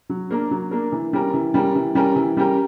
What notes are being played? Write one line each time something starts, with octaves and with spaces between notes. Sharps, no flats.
F#3
A#3 D4 A#4
F#3
A#3 D4 A#4
E3
G3 C#4 G4 A#4
E3
G3 C#4 G4 A#4
E3
G3 C#4 G4 A#4
E3
G3 C#4 G4 A#4